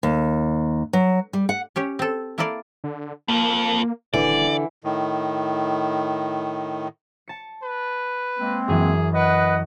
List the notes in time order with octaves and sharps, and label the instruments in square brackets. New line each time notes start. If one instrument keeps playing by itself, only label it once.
[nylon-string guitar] D#2
F#3
G3
F#5
[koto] C#4 G4 C#5
C4 A4
A#3 E4 A4 A#4 D5 F5
[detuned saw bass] D3
[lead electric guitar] F2 F3 [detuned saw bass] A#3
[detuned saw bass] D#1 [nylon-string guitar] D3 [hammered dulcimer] E3 [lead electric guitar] D5
[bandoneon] A2 D#3
[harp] A5 C#7
[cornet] B4
[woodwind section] G#3 A#3 C4
[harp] F#2 E3 [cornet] G#4
[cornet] B4 [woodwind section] D#5 F#5